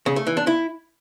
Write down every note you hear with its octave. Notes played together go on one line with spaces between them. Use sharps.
C#3
A3
E3
D4
E4